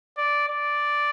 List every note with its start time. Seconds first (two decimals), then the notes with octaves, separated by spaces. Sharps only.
0.17 D5
0.48 D5